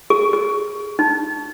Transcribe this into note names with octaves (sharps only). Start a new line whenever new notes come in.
G#4
G#4
D#4